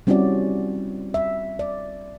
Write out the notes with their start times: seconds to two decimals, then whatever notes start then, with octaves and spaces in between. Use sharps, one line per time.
0.07 G3 C4 C#4 E4 F#4 D5
1.14 E5
1.59 D5